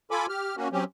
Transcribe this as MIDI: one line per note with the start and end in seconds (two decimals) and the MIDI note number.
0.11 0.26 65
0.11 0.26 69
0.11 0.26 80
0.11 0.26 83
0.11 0.26 86
0.29 0.55 67
0.29 0.55 89
0.57 0.68 58
0.57 0.68 61
0.57 0.68 66
0.72 0.84 54
0.72 0.84 60
0.72 0.84 61
0.72 0.84 67